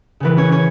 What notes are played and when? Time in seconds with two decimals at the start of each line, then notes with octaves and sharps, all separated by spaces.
0.20 C#3 E3 B3 B4
0.37 C#4 C#5
0.52 C#4 C#5